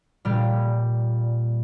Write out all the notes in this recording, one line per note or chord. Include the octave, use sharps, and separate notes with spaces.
A#2 G3